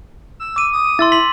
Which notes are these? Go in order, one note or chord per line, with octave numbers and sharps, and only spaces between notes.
E6
D6 D#7
D#6
E4 C6 E6 A6
C6 B6 F#7